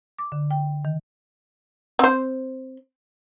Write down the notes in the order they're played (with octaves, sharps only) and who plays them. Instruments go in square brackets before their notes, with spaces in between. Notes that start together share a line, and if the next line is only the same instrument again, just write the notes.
[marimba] D6
D3
G5
D#3
[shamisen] C4 C5